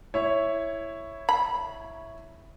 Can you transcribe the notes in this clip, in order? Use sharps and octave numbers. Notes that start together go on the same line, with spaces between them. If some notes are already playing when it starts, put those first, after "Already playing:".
E4 C#5
B5